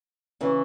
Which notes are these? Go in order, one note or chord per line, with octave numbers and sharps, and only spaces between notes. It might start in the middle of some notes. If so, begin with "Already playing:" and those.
C#3 E3